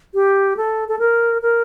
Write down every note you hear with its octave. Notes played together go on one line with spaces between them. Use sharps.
G4
A4
A4
A#4
A#4